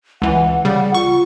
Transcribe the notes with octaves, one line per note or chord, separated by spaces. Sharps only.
C#2 E3 F#5
C#3 G3 F#5
F4 C#6